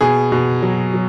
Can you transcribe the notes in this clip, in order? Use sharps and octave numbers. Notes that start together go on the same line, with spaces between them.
B2 G#4
B2
F#3
F#3